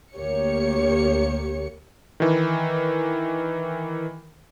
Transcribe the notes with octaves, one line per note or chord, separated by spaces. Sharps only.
D2 A#3 G4 C#5 C#7
D#3 E3